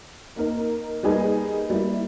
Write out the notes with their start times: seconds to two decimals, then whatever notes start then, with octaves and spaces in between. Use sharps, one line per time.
0.36 A#3 D#4 A#4
1.03 G3 A#3 D#4 G#4 B4
1.70 G3 A#3 E4